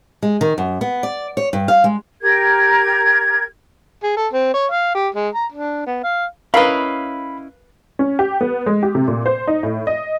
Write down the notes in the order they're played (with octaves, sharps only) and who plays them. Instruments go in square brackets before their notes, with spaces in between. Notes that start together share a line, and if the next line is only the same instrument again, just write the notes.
[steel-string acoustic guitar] G#3
D#3
F#2
B3
D5
C#5
G2
F5
G#3
[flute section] G4 A#4 G#6
[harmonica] G#4
A4
C4
C#5
F5
G4
G#3
A#5
D4
B3
F5
[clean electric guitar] C#4 E4 D#5 [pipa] A#4 B4 [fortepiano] F5 [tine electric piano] B5
[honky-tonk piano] C#4
G4
B3
G#3
G4
C3
A#2
C5
D#4
A2
D#5